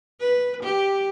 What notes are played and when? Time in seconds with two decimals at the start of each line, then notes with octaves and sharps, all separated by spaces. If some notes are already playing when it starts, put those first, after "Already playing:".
0.21 B4
0.63 G4